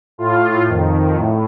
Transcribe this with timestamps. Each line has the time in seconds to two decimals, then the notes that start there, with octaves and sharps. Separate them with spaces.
0.18 A2 F4
0.68 F2 D#3
1.17 A2